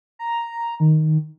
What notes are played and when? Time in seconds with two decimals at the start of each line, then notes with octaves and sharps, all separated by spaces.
0.19 A#5
0.80 D#3